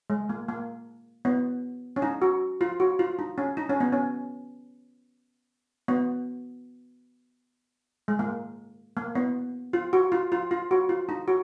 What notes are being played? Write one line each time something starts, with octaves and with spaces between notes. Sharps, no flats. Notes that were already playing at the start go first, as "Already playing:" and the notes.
G#3
A#3
A#3
B3
C#4
D#4
F#4
F4
F#4
F4
D#4
C#4
D#4
C#4
B3
C#4
B3
G#3
A#3
A#3
B3
F4
F#4
F4
F4
F4
F#4
F4
D#4
F#4